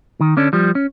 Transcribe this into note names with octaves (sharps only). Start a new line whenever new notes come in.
D#3
D3 C#4 D4
F3 G3
C#4